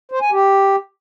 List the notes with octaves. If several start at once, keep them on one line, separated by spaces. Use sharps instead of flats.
C5
G#5
G4